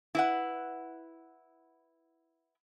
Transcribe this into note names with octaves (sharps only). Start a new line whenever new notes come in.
E4 B4 F#5